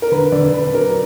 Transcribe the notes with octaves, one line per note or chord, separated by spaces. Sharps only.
A#4
D3 B4
D3 D5
D3 B4
F#3 A#4